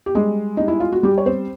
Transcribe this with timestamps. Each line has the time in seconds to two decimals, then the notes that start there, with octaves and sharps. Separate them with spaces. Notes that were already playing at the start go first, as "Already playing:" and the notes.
0.06 G4
0.15 G3 G#3 G#4
0.57 G3 D#4
0.68 E4
0.80 F4
0.92 F#4
1.03 G3 G4
1.18 C#5
1.25 C4 C5